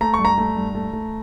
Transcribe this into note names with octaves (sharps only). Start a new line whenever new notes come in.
A3 A#5
C#6
G2
A#5
A3
G2
A3
A3